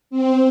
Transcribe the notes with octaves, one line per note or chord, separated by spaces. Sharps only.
C4